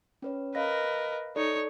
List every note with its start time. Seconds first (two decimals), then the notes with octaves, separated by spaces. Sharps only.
0.22 C#4 B4 C#5
0.55 A#4 B4 D#5 F5 A#6
1.36 D#4 A4 C#5 D5